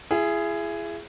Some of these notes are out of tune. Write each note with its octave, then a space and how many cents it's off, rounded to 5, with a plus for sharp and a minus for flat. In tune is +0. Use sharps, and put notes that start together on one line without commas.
E4 +35 G#4 +0